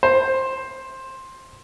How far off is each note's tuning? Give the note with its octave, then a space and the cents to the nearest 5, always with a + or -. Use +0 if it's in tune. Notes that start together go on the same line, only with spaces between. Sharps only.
C5 +10